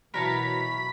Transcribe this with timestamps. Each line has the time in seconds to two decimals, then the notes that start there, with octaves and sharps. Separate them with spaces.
0.14 B2 E3 F#3 A#4 C#5 A5 B5